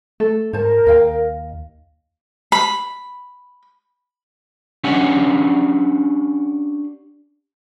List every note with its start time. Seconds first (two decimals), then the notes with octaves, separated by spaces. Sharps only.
0.20 A3 A4
0.53 G#2 A#4 C5 A5
0.86 D#2 D#5 F5 G5
2.52 B5
4.84 C#4 D4 G4 D5 F#5 G#5